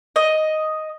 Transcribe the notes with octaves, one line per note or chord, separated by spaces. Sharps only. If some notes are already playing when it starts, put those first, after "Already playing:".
D#5